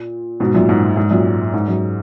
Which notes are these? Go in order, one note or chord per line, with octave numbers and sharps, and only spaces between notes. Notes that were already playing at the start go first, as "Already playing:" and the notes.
Already playing: A#2
G#2 B2
F#2 A#2
G#2
G#2
F#2 A#2
G#2
F#2